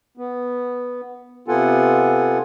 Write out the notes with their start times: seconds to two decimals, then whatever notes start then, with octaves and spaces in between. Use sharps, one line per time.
0.17 B3
1.48 C3 B3 F4 A4 F#5 G#5